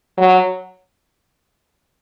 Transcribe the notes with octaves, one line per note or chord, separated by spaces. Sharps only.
F#3